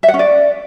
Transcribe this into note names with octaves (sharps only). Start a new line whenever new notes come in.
E5
F#5
C#4
D5